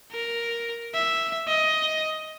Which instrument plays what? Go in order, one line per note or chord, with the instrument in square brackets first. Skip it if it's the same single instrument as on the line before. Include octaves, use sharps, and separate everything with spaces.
[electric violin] A#4
E5
D#5